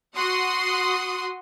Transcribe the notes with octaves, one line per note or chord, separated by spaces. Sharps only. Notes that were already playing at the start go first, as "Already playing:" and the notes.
F#4 F#5 C6 D#6